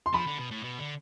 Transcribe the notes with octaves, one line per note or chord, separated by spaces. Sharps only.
C6
F3 B5
D3
B2
A2
B2
D3